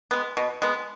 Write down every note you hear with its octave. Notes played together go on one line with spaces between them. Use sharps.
G#3 B3
B2
G#3 B3